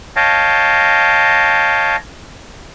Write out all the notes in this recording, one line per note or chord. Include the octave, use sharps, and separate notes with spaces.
C#5 D#5 F5 G5 A5